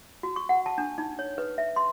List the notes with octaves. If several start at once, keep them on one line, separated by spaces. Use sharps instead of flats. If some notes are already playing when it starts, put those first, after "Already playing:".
F#4
C#6
F#5
A5
D4
D#4
C#5
B4
E5
C6